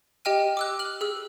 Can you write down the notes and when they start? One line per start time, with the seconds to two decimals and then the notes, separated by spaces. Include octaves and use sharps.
0.25 G4 D#5 G5 F6 D#7
0.57 D6 E6 F#6
0.79 F6 F#7
1.01 G#4 E6